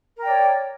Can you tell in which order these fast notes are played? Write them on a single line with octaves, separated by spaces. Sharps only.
A#4 G5 D5 C#5